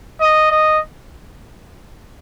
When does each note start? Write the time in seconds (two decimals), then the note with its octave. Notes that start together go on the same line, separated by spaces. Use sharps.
0.21 D#5
0.51 D#5